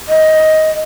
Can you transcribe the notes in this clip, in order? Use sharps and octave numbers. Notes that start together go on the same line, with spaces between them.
D#5